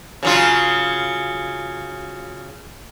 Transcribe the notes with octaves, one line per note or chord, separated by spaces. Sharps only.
C#3 F#3 F4